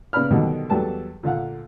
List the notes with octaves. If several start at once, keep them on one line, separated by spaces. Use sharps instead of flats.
C#3 B3 D5 B5 F6
B2 D3 D#3 F#3 G3
E2 F#3 G3 A4 B4 A5
A#2 D3 F5 F#5